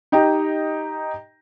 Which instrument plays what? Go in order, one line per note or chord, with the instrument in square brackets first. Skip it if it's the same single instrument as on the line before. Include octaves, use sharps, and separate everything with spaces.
[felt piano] D#4 G4 D#5 G5 A#5